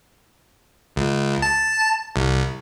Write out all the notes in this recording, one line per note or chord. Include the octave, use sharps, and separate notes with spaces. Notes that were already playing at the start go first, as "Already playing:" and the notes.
C#2
A5
C2